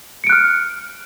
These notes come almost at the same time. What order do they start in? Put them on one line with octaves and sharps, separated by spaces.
C#7 D7 F#6 F6